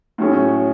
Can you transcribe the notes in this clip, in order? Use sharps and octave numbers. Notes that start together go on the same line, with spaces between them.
A2 F#3 C#4 G#4